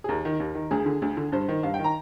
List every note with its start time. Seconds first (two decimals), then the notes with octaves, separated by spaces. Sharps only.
0.04 G#4
0.09 D#2 A#4
0.25 D#3
0.40 D#2
0.55 D#3
0.71 D2 G#4
0.86 D3
1.02 D2
1.17 D3
1.32 G2 C5
1.48 D#3
1.63 G2 F5
1.74 G5
1.79 D#3
1.84 A#5